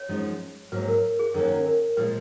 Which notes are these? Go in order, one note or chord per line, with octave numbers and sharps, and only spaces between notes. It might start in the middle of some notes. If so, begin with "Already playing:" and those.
Already playing: C#5
F#2 F3 G#3 D#4
G#2 F#3 A#3 B4
A#4
G#4
F#2 D#3 F#3 A#3 C#4 A#4
A#4
A#2 F3 G#3 B4